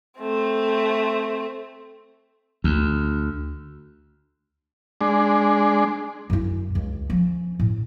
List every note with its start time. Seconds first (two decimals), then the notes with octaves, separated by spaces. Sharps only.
0.20 A3 C4
2.64 D2
5.01 G#3 D4
6.30 F#2 E4
6.75 C#2
7.10 F3 C#4
7.60 A2